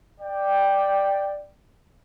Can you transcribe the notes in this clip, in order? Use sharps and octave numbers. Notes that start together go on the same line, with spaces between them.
D5 G5